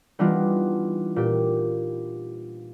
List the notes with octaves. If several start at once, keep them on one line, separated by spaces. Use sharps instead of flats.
E3 G3 B3 D4 D#4 F4
A#2 G4